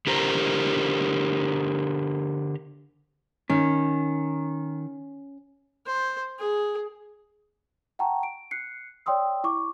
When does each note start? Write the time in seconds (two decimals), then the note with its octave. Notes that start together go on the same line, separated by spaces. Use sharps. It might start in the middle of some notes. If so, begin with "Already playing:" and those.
0.07 D3 G4 A#4 C5 A#5
3.50 D#3 C#4
5.86 C5
6.39 G#4
7.99 F#5 G5 A5 A#5 C#6
8.23 D7
8.51 F#6 C7 C#7
9.06 C#5 D5 G5 C6 D#6 E6
9.44 E4 C#6 D6